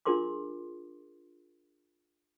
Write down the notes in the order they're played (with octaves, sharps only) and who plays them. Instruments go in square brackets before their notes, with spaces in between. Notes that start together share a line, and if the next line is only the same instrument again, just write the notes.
[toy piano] D4 F4 G#4 A#4 C6 D6